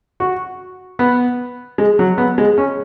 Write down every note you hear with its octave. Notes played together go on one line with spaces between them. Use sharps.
F#4
B3
G#3
F#3
B3
G#3
C#4